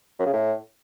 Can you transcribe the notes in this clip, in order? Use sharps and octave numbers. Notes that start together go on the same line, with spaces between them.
F#2
C#3
A2